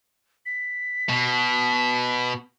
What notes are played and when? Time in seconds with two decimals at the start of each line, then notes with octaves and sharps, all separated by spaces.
0.46 B6
1.09 B2